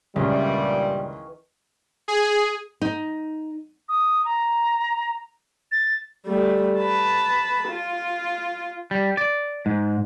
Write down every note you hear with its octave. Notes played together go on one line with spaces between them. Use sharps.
C#2 G2 A#2 D#3 E3 G3 C#4
G#4
D#4
D#6
A#5
A6
G3 A3
B4 A5
F4
G3
D5
G#2